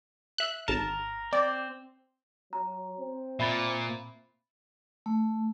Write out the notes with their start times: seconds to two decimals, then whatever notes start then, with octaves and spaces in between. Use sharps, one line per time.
0.38 E5 F#6
0.68 G#1 A#4 A5
1.33 C4 D5
2.53 F#3 A#5
3.00 C4
3.40 A#2 E5 B5 A6
5.06 A3